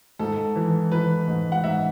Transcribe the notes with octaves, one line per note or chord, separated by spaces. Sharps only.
G#2 A4
E3
E3 B4
G#2
F#5
G#2 E5